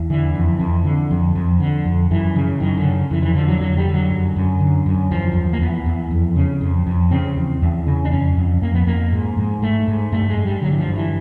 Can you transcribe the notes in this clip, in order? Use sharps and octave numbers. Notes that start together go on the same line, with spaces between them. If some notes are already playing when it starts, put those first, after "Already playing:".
Already playing: E2
D3 E3
F2
F2
D3
F2
F2
D3
F2
F#2 E3
C#3
F#2 D#3
D3
C#3
F2 E3
E3
D3 F3
F#3
F2 F#3
G3
D3
F#3
F#2
F#2
D3
F#2
E2 F3
E2
A#3
E2 B3
E2
F2
C#3
F2
F2
C#3 C4
E2
E2
C#3
D4
F2 C#4
F2
F2 A#3
B3
F2 A#3
G#2
G#2
G#2 A3
G#2
G2 A3
G#3
G2
G3
D3 F#3
E3
F3
G2
E3